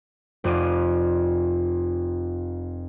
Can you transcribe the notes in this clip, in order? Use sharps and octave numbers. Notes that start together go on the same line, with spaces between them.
F1 F2 D5 D#7